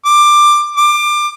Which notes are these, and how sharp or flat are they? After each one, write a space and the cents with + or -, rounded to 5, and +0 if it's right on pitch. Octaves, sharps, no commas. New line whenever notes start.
D6 +15
D6 +25